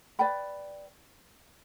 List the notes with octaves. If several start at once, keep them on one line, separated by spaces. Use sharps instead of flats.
B4 D5 G5 B5